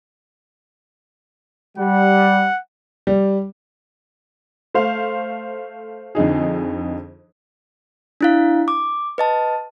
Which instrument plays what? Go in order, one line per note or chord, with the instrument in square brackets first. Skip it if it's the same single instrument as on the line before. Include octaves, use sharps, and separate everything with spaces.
[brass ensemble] G3 [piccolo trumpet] F#5
[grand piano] G3
[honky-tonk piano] A3 C5 F5
F2 D3 D#4 G#4
[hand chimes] D4 E4 F5
D6
B4 D#5 A5